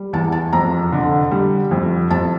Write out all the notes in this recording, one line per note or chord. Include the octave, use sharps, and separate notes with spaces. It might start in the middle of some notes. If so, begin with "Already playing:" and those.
Already playing: G3
E2 A5
A5
F2 A#5
D3
G3
F2
F2 A5